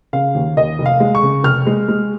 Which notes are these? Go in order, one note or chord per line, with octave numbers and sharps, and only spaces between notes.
C#3 F5
D#2
D#2 D#5
F1
F5
G#3
C#6
C#3
F1 F6
G#3
G#3